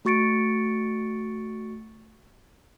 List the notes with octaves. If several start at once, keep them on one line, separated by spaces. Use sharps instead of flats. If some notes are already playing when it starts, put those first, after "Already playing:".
A3 F#4 C#6 A6 C#7 D7